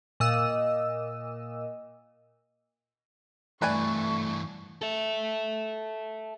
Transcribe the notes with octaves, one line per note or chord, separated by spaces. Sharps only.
A#2 D#5 E6
G2 E3 A3 B4 D5 G#5 C#6
A4 E5